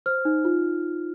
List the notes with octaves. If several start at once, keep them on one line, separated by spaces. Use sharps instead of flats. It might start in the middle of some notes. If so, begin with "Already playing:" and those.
C5 F6
D#4
F4